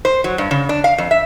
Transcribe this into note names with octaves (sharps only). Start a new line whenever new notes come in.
C5
F#3
G2
C#3
D4
F5
F2
E5